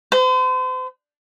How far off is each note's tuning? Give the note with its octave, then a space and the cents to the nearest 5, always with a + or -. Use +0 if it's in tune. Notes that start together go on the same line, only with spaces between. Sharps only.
C5 -40